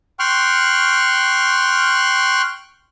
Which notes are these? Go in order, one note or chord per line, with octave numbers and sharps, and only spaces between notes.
G5 C6 C#6 F6 F#6